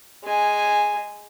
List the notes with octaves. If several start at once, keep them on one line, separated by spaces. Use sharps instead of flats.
G#3 G#5